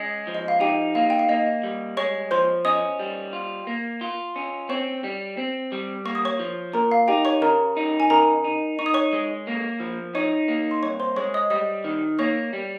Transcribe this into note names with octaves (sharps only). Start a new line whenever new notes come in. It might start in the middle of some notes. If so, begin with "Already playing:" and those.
Already playing: G#3 C#4
F3
D#5
F5
D#4 G4 G5
A#3 F5
G5
F5
A#3 D#5
G3
G#3 C#5 C#6
F3 C5 C6
C#4 D#5 D#6
G3
F4
A#3
F4
C#4
C4 C#5 C#6
G3
C4
G3
A#3 C#6
D#6
C#5 C#6
F3
A#2 A#4 A#5
F5
D#4 G4 G5
C#5 C#6
C#3 A#4 A#5
D#4
G#5
C#3 A#4 A#5
D#4
D#4 C#6
D#6
C#5 C#6
G#3
A#3
F3
D#4 C#5 C#6
A#3
C6
C2 C#5 C#6
C5 C6
G#3 C#5 C#6
D#5 D#6
G3 D#5 D#6
D#3
A#3 C#5 C#6
G3